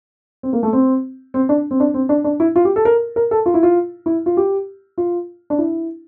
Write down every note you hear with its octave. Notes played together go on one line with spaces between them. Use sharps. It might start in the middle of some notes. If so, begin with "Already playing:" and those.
C4
A#3
A3
C4
C4
D4
C4
D4
C4
D4
D4
E4
F4
G4
A4
A#4
A#4
A4
F4
E4
F4
E4
F4
G4
F4
D4
E4